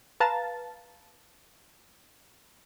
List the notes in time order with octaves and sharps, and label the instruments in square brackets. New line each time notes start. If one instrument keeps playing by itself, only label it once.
[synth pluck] B4 F5 A5 A#5 A6